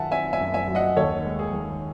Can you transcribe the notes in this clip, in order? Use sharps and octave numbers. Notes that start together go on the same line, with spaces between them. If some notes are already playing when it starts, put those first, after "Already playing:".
Already playing: F#2 D#3 F#3 E5 F#5 G#5 A5
C4 E5 G#5
E5 G#5
F#2
E5 G#5
F#3
D#5 F#5
D#2 A4 C#5
G#3
G#4
D#3